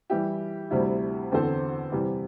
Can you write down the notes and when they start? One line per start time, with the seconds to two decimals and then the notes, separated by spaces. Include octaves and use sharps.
0.10 E3 G3 E4 G4
0.70 D2 C3 G3 E4
1.32 E2 D3 C4 A4 C5
1.92 C3 E3 G3